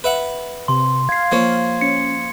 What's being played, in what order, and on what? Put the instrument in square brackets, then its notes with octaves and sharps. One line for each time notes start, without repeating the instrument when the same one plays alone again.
[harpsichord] B4 E5 F#5
[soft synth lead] C3 [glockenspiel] C6
[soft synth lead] F5 [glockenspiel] G#6 C7
[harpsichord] F3 A#3 C#5
[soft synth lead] C#4 [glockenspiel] C#7